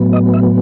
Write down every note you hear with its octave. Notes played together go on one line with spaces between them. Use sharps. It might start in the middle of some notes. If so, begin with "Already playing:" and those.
Already playing: A2 F#3 B3
D#5
E5